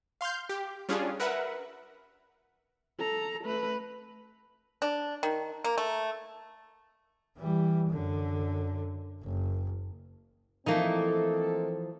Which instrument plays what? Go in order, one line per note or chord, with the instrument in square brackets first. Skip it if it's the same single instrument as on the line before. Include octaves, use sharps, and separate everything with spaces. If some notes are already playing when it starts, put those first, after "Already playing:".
[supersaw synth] F5 C6 F6 G6
G4
G3 C#4 D4 F4 G#4
A#4 B4 E5 F#5
[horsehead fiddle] A4 A#5
A3 B4
[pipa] D4
D#3
A#3
A3
[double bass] E3 G3
F#2 D3
F#1
[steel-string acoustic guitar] E3 F3 [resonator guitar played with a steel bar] A3 A#3 D#4 [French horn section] C4 A4